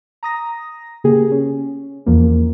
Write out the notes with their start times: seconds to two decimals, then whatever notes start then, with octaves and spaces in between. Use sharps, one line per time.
0.23 A#5 D#6 A#6
1.04 C#3 A#3 G4 G#4
1.31 C#4
2.06 E2 E3 F3 A#3